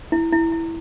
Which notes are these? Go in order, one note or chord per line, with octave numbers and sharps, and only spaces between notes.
E4
E4
E4